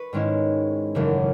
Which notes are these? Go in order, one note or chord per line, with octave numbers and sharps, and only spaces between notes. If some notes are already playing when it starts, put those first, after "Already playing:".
Already playing: B4 C#6
G#2 D#3 G#3 C#4 E4
F#1 F#2 C#3 E3 A3